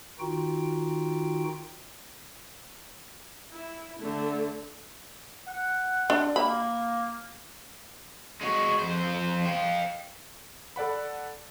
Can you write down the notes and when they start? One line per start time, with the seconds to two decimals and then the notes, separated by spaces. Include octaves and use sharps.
0.19 D#3 D#4 F4 F#4 G5
3.53 E4
3.99 D3 A3
5.47 F#5
6.10 D4
6.36 A#3 B5
8.41 G#3 F#4
8.79 F2 C5
9.46 F5 G5
10.76 A4 D5 F#5 B5